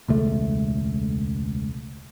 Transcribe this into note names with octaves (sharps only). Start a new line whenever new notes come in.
E1 C#2 A3